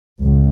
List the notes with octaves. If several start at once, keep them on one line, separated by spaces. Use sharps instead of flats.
C#2